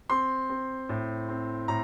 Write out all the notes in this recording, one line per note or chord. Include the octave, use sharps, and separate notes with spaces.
C4 C6
C4
A2
C4
A2 A#5